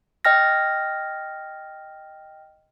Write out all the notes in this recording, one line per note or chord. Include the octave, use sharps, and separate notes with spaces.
D#5 G5 F6 A#6